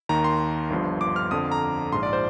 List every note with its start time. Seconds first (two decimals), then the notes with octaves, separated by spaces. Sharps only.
0.09 D#2 D#3 A#5
0.24 C6
0.70 G1 G2 F3
1.01 D6
1.16 F6
1.31 F2 D3 F3 D#6
1.52 A#5
1.92 A#1 G#2 F3 C6
2.03 D5
2.13 C5